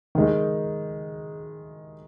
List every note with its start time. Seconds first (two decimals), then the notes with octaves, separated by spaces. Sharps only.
0.15 D#3 G#3 D#4